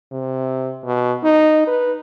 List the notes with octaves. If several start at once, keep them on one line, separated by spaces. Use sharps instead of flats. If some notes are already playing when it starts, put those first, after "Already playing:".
C3
B2
D#4
B4